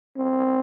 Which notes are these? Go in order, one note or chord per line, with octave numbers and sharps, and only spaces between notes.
C4